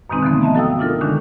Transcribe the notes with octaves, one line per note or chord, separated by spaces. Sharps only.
F#2 B2 D#3 G#3 C4 D#4
D3 E3 F3 A3 B3
D#5 E5 A5 A#5
F#4 A4 F5 G5 D#6 E6
D4 D#4 F4 A4 A#4
D3 D#3 G#3 C#4 D4